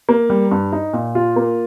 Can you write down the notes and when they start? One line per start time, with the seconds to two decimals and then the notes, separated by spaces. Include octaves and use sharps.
0.09 A#3
0.30 G3
0.51 G2
0.72 D#4
0.93 A#2
1.15 F4
1.36 A#3